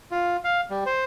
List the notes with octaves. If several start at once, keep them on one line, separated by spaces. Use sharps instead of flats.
F4
F5
G3
C5